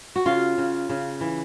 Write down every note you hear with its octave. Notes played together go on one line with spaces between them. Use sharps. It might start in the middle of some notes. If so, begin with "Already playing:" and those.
F#4
C#3 F4
C#3
C#3
E3